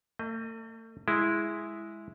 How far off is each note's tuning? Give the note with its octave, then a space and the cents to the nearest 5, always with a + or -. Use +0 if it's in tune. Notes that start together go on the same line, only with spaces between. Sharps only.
A3 +45 D#5 +0
G#3 +0 E4 +0